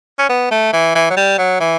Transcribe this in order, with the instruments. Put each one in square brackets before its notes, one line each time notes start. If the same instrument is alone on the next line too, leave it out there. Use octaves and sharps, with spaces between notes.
[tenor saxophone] C#4
B3
A3
E3
E3
F#3
G3
F#3
E3